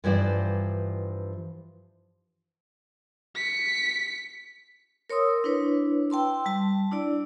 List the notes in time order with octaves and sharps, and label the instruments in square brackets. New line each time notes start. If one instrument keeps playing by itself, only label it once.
[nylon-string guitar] G2 E3 F3 C5 D5
[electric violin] B6 C#7
[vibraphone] A#4 C#5 C6 D#6 E6
D4 E4 B4 C#5
G5 A5 C6 E6
G3 A5
D4 E4 D5